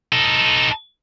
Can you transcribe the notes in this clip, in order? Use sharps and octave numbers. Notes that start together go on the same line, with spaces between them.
D#4 A4